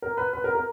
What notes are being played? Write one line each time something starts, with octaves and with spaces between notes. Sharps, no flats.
A#4
B4
B4
A#4
A#4